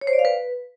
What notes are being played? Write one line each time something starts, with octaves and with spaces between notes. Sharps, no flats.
C#5
C5
D5
F5
B4